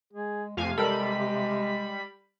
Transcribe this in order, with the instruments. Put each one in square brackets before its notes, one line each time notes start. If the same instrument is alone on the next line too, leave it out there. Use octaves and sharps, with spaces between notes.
[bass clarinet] G#3 [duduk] G#4
[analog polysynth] F2 F5 G#5 [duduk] C3 [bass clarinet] A3
[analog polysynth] G3 B5 [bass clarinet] G#3 [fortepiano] A4 A#4